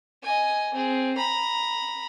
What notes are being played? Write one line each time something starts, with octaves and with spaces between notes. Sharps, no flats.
D#5 G#5
C4 G#4
A#5 B5